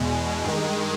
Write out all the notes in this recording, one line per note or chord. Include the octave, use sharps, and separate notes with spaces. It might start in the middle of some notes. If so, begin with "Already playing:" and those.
Already playing: E2 B2 G#3
G2 D#3